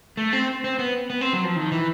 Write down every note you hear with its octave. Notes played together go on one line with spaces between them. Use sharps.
A3
C4
C4
B3
B3
C4
F#3
F3
D#3
E3